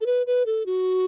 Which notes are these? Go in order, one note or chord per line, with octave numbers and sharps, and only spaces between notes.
A4
B4
B4
A4
F#4